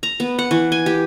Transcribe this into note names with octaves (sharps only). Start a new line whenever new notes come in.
A#5
B3
F#5
E3
G#5
G4